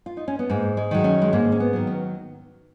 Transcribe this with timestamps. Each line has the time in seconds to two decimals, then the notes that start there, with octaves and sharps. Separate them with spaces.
0.06 F4
0.17 D#4
0.28 C#4
0.39 B3
0.50 G#2 A#3
0.77 G#3
0.91 D#3 F#3
1.04 C#4
1.22 G#3
1.33 G#2 A#3
1.52 C#4
1.60 B3
1.73 D#3 F#3
1.87 C#4